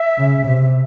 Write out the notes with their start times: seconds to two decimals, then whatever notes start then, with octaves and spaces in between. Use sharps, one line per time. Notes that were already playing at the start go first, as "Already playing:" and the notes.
Already playing: E5
0.18 C#3
0.47 C3